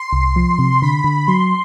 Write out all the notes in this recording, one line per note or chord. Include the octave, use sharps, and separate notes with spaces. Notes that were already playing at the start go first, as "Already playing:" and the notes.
Already playing: C6
C2
F3
C3
D3 B5
D3
F#3 C6